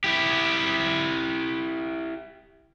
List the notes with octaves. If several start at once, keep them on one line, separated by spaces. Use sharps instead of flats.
E4 G4